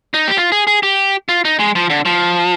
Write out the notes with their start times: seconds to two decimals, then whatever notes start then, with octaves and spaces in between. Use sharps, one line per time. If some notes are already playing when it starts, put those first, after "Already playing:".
0.14 D#4
0.28 G4
0.38 F4
0.52 G#4
0.67 G#4
0.83 G4
1.29 F4
1.45 D#4
1.60 G#3
1.75 F3
1.90 D3
2.05 F3